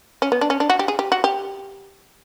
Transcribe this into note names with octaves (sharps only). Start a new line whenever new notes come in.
C#4
B3
D4
C#4
D4
F#4
G4
G#4
G4
F#4
G4